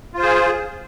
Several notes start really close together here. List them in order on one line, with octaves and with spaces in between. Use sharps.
F4 C5 G#4